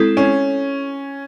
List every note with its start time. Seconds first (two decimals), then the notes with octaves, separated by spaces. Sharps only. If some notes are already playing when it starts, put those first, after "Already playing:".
Already playing: G#3 C4 E4 A4
0.17 C#4